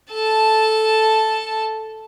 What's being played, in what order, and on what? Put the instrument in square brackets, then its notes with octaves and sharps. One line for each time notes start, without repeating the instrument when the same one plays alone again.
[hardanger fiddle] A4 A5